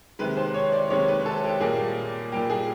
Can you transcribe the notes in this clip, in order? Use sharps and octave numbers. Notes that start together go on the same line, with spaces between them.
C3 D#3 G#3 B4
C5
C#5
D5
C3 D#3 G#3 C#5
B4
A4
G4
A#2 G3 A#3 G#4
A#2 G3 A#3 G4
G#4